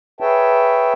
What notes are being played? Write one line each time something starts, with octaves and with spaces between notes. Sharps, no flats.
G#4 B4 C#5 E5 G5 A5